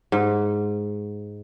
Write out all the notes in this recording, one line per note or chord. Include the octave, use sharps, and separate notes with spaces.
G#2